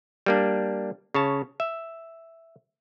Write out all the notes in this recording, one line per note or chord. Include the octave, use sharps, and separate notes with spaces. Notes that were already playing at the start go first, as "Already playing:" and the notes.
G3 A#3 D4
C#3 C#5 A5
E5